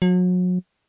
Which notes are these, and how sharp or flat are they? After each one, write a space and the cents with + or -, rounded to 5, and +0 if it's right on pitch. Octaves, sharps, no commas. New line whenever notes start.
F#3 -35